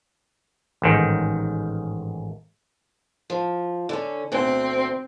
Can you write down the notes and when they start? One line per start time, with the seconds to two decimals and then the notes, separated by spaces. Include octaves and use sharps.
0.82 A1 G#2 D#3
3.30 F3
3.89 D3 C#4
4.32 D2 B2 C4